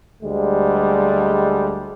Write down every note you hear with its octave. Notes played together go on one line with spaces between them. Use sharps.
D2 G3 G#3